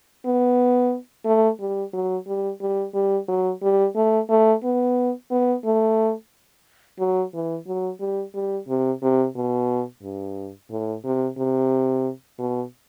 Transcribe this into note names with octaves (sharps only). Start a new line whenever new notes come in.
B3
A3
G3
F#3
G3
G3
G3
F#3
G3
A3
A3
B3
B3
A3
F#3
E3
F#3
G3
G3
C3
C3
B2
G2
A2
C3
C3
B2